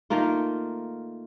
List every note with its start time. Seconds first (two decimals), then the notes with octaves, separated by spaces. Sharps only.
0.10 D#3 A3 A#3 F4